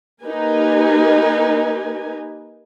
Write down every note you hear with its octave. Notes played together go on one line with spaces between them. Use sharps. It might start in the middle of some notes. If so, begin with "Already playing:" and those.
A#3 D#4 G4 A#4 B4 G#5